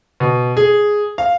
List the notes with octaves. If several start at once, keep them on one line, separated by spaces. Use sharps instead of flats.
B2
G#4
F5